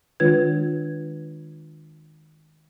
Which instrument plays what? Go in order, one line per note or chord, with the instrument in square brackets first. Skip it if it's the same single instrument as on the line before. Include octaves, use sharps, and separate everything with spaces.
[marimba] D#3 G#3 D4 F4 B4 G#6